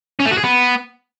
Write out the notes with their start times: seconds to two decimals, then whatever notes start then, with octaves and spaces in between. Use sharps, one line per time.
0.20 C#4
0.26 A3
0.32 F#4
0.38 G#4
0.44 B3